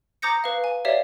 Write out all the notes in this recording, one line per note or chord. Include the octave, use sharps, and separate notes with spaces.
A#5 D6 D#6 G6 A#6 C#7
B4 F5
G#5
G4 C#5 D5 E5 F5